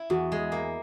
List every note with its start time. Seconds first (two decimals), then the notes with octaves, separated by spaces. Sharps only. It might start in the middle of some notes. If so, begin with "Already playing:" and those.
Already playing: E4
0.10 E2 F#4
0.32 G#3
0.52 A#3